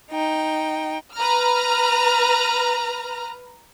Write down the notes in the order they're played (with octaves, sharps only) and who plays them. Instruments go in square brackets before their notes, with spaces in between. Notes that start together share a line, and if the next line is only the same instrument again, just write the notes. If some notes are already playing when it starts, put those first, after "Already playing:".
[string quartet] D#4 G5
[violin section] B4 A#5 F6